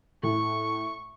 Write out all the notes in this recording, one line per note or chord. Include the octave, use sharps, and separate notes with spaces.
A2 C#6